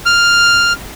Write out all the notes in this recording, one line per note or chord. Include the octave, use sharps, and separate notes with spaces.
F6